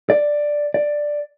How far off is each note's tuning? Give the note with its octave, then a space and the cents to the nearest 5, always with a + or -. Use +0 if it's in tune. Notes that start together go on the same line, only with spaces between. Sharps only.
D5 +5
D5 +5